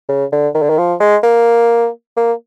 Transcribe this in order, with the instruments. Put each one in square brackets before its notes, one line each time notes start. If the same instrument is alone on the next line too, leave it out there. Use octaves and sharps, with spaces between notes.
[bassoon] C#3
D3
D#3
D3
D#3
F3
G#3
A#3
A#3